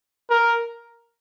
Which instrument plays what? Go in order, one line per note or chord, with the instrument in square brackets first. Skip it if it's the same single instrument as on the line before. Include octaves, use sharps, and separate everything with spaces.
[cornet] A#4